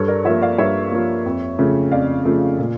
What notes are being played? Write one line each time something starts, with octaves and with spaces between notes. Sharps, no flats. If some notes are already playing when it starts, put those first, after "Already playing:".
Already playing: G2 A4 C#5
A#4 D5
F3 A#3 C#5 E5
D5 F5
G2 C#5 E5
F3 A#3
F2
C#3 F3 A3
F2 D5 F5
C#3 F3 A3
A#2